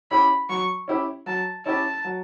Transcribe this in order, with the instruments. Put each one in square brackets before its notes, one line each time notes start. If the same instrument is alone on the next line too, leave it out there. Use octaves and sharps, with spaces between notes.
[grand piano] C#4 E4 G4 [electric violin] B5
[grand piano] F#3 [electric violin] C#6
[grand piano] C#4 E4 G4
[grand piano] F#3 [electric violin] A5
[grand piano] C#4 E4 G4 [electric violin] A5
[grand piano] F#3